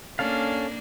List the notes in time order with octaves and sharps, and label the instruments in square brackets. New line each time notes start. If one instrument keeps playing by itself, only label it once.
[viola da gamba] A#3 D4 D5 [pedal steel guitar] C#4 A4 F5